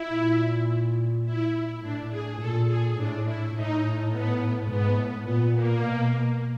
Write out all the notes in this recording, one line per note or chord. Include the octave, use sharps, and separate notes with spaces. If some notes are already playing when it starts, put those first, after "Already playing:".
Already playing: E4
A#2
E4
A2 D4
G#4
A#2 A4
G#4
A2 D4
E4
A2 D#4
B3
G#2 B3
A2
A#2 B3
A#3
B2